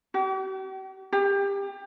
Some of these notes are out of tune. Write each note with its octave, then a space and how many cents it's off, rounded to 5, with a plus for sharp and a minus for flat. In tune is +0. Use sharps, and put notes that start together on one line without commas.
G4 -45
G4 +25